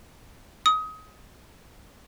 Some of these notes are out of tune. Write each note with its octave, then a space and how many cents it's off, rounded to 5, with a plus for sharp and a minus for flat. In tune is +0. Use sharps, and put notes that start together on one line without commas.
D#6 +25